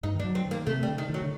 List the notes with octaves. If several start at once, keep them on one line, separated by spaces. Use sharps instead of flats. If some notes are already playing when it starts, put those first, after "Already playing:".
G2 D#4
D#3
D4
F#3
C4
D#3
A#3
C3 A3
G3
D3
D#3
D#3 F#3
D3